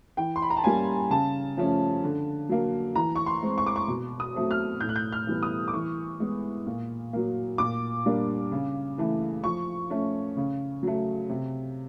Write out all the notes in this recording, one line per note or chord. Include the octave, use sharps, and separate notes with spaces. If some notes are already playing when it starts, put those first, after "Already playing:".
E3 G5
C6
B5
A#5
A5
G3 A#3 C#4 G#5
C#3 A5
F3 A3 C#4
D3
F#3 A#3
E3 A#5
C#6
C6
G#3 C4
C#6
D6
C#6
B2
D#6
F#3 A3 C4
F6
A2 G6
F#6
G6
F6
E3 G3 B3
D#6
D6
E3 C#6
G#3 B3
A#2
F#3 A#3
A#2 D6
G3 A#3 D4
C#3
E3 A3
F3 C#6
A3 C#4
C#3
F#3 A3
C3